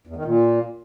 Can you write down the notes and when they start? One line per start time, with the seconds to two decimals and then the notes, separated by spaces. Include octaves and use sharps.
0.07 E2
0.16 D#3
0.25 A#2